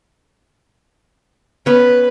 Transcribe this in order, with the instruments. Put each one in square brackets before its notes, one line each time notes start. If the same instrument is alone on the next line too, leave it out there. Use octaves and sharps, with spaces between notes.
[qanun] B3 C#4 [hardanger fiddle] B4